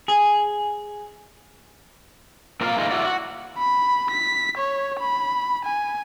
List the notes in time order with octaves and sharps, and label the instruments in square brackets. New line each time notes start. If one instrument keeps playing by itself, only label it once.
[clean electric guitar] G#4
[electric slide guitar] A#3 C4 F4 A#4 D#5 F5
E3 G#3 A#3 D#4 F4
E4 F#4 D5
F#4
[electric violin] B5
B6
C#5
B5
G#5